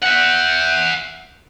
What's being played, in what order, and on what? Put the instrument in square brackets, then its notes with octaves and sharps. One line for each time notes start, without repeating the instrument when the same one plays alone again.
[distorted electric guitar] E5 F#5